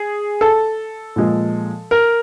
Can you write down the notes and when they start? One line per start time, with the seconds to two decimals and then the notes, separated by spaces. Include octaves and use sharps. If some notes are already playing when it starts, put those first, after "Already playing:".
Already playing: G#4
0.41 A4
1.16 A#2 F3 G#3
1.91 A#4